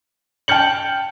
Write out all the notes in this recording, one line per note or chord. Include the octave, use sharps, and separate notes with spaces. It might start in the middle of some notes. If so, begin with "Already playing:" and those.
G5 A5 F6 G6 C#7 F#7